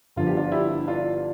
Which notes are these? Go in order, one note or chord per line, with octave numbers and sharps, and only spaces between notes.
G1 G2 D3 F3 F4
G4
D4 F4
E4 G4
D4 F4